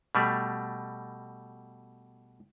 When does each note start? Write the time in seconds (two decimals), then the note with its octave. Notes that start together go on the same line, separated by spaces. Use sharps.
0.15 B2 G3 A3